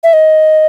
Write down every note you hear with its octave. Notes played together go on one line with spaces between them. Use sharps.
E5
D#5